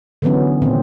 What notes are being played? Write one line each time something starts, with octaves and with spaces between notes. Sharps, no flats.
D3 E3 F#3 B3 C#4
A#2 D#3 C4